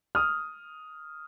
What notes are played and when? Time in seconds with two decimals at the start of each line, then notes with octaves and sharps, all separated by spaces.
0.15 D#6 F6